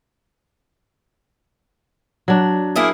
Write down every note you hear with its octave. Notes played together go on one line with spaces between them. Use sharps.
F#3 D4
A#3 E4 G#4